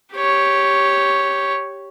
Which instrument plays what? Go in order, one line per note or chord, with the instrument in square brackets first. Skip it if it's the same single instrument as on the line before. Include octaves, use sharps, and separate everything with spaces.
[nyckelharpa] G4 C#5